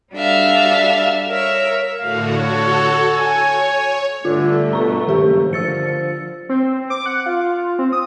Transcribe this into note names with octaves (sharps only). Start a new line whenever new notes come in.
G3 D4 F#4 A4 E5 F5
A#4 C#5 E5
A2 D3 F#4 F5
F#4 A4 C#5
C#5 G#5
G2 D3 A3 F4
B2 A#5 C#6
F#1 D#3 G4 A#4
D3 F3 E6 A6 C#7
C4
D6
F#5
F4
C4
D#6